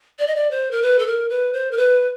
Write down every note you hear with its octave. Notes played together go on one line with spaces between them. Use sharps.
D5
D#5
D5
C5
A#4
B4
A4
A#4
B4
C5
A#4
B4